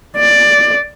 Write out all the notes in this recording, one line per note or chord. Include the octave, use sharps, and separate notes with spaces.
D5